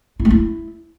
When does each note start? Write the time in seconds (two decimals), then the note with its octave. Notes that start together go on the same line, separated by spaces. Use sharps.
0.19 E4
0.25 A3
0.30 E4